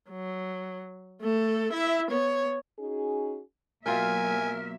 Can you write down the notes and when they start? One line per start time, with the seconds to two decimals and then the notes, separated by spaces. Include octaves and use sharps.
0.10 F#3
1.21 A3 A4
1.72 E4 E5
2.10 B3 C#5
2.79 C#4 D#4 F#4 G#4
3.86 B2 F#3 A#3 F4 A#4 E5 G5 G#5